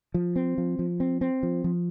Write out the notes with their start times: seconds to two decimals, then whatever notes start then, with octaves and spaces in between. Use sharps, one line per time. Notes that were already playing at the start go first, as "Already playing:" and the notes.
0.14 F3
0.36 C4
0.58 F3
0.79 F3
1.00 C4
1.21 C4
1.43 F3
1.64 F3